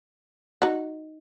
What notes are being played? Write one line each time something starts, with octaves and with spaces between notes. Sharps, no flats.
D#4 F#4